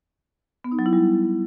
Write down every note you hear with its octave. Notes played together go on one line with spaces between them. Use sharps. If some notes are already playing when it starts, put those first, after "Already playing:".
B3
D#4
F#3
E4
G3